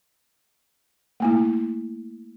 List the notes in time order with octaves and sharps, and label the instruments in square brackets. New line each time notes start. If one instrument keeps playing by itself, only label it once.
[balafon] A3 A#3 E4